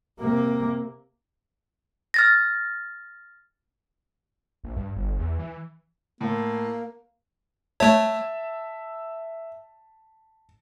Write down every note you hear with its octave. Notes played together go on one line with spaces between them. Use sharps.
C3 A#3
F6 A6 A#6
A#1
G2
G1
E2
E3
A2 A#3
A3 C#5 E5 A5